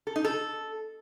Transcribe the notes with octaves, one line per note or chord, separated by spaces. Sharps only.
A4
D#4
A4